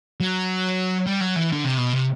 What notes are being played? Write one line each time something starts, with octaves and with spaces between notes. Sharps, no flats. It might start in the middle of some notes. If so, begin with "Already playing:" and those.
F#3
G3
F#3
E3
D3
C3
B2
C3